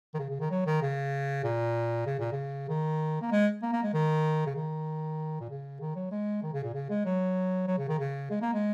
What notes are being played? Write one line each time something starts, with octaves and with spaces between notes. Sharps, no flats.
D#3
C#3
C#3
D#3
F#3
D#3
C#3
A#2
C#3
A#2
C#3
D#3
A#3
G#3
A#3
A#3
G#3
D#3
C#3
D#3
A#2
C#3
D#3
F#3
G#3
D#3
C#3
A#2
C#3
G#3
F#3
F#3
C#3
D#3
C#3
G#3
A#3
G#3